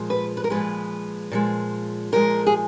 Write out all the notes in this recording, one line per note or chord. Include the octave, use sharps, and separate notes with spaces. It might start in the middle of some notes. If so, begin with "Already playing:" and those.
Already playing: A#2 F3 G#3
B4
B4
A#4
A#2 F3 G#3 B4
A#2 F3 G#3
A#2 F3 G#3 A#4
G#4